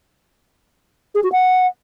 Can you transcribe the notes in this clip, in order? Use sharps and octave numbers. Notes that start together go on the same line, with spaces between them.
G#4
F#4
F#5